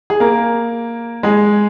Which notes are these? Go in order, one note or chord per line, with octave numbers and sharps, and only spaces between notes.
G#4
A#3 A#4
G#3 G#4